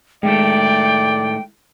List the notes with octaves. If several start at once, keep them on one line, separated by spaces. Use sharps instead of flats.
A2 D#3 G#3 A3 D5 G5